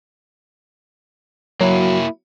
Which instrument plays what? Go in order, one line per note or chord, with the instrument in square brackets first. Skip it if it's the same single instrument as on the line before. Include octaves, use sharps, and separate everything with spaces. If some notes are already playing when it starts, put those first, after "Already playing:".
[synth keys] F#3 [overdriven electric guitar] A#3 E4